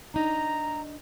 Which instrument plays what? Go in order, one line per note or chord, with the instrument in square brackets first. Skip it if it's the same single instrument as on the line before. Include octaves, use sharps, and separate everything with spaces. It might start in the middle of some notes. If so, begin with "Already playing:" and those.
[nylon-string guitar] D4 D#4 [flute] A#5